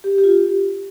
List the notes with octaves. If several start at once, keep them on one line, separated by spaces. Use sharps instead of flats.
G4
G4
F4